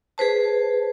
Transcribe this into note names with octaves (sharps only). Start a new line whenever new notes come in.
G#4 B4 C5 A5